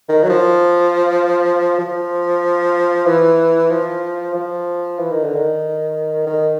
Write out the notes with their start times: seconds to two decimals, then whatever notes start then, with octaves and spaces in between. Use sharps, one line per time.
0.09 D#3
0.23 F#3
0.29 F3
1.79 F3
3.06 E3
3.71 F3
4.34 F3
4.99 E3
5.10 D#3
5.23 D3
5.36 D#3
6.26 D#3